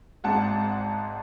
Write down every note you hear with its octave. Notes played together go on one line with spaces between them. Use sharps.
G#1 G#2 G#3 F#5 A5